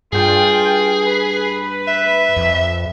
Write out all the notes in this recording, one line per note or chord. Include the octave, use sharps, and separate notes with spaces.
G2 F4 G#4 G5
B4
E5
F2